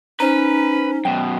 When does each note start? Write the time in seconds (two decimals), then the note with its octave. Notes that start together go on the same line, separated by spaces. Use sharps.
0.20 C#4 D#4 B4 C5 A#5
1.05 F#2 B2 G5